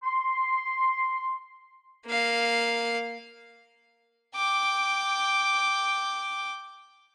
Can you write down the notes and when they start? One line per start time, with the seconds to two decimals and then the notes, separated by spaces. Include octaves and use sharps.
0.04 C6
2.06 A#3 F5
4.35 G5 D6